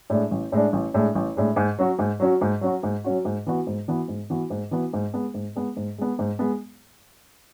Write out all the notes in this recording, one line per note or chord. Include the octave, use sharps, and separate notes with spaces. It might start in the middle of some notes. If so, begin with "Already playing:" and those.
A2 G#3 D4
A1
A2 G#3 D4
A1
A2 G#3 D4
A1
A2 G#3 D4
G#2
F#3 C#4 F#4
G#2
F#3 C#4 F#4
G#2
F#3 C#4 F#4
G#2
F#3 C#4 F#4
G#2
E3 B3 F#4
G#2
E3 B3 F#4
G#2
E3 B3 F#4
G#2
E3 B3 F#4
G#2
G#3 B3
G#2
G#3 B3
G#2
G#3 B3
G#2
G#3 B3